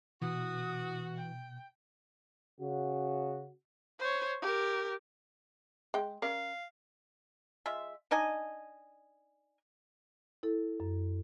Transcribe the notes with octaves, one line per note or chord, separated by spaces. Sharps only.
B2 E3 F#4 D#6
G5
C#3 F#4
C5 C#5
G4 A#4
G#3 G5
C#4 A#4 D5 F5
G#3 F4 E5
D4 D#4 D#5 G#5
E4 A4
F#2